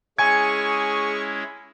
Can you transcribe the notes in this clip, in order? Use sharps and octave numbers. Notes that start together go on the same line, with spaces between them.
G#3 C#4 E4 G#4 G#5 C#6 G#6